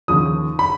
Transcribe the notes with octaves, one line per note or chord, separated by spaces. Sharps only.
D#2 C#3 F3 D#6
B5